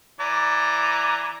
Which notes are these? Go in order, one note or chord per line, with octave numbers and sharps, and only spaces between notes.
E3 D5 A#5